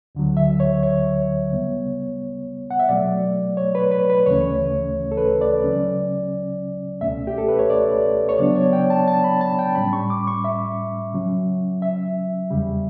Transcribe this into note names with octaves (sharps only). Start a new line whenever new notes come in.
D2 D3 F#3
E5
C#5
C#5
C#3 G3 B3
F#5
E5
B2 F#3 A3 D5
C#5
B4
B4
B4
D2 C#3 E3 A3 C#4 C#5
A4
B4
D5
C#3 F#3 C#4
C#2 B2 A3 C#4 E5
G4
A4
B4
C#5
D5
C#5
C#3 F#3 B3 D4 D5
C#5
G5
A5
A5
B5
A5
G5
A2 G3 C#4 B5
C#6
D6
C#6
E5
C#3 F#3 C#4
E5
E2 C#3 G3